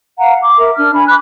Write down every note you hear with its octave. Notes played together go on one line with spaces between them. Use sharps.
F5 F#5 A#5
D6
A#4 E5
D4 F6
G#5 B5
B5 D6 F#6